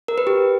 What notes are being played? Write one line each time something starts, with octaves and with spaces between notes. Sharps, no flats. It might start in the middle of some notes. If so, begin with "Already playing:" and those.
A#4
B4
G4